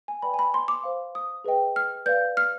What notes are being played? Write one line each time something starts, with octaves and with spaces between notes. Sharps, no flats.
G#5
B4 D5 G5 B5
G#5
B5
C6
D6
C5 F5
D#6
G#4 B4 D#5 G5
F6
B4 D5 F5 G6
F6